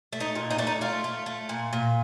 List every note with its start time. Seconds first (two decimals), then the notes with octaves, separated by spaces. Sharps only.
0.12 A3
0.20 D#4
0.35 A#2
0.50 D#4
0.58 A3 D4
0.67 D#4
0.81 A3 F4
1.04 A3
1.26 A3
1.49 A#2
1.73 A#2